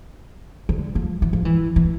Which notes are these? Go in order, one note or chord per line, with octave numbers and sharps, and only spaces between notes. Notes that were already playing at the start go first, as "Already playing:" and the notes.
D3
F3
E3
F3
E3
E3